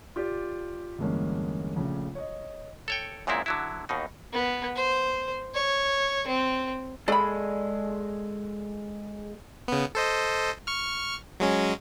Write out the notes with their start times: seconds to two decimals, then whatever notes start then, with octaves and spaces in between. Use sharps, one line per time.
0.16 F4 G4 D5
0.98 E2 G2 D3 G#3 A#3 C#4
1.76 A#1 C#3 A3
2.15 C#5 D#5
2.88 A4 C#5 G5
3.27 F#2 A#2 G#3 C4 E4
3.46 D3 F#3 E4
3.89 D#2 B2 D#4
4.32 B3
4.76 C5
5.54 C#5
6.27 C4
7.08 G#3 G#4 A4 D5 B5
9.68 C#3 B3
9.95 A4 C5 D#5
10.67 C#6 F6
11.40 F#3 G#3 C#4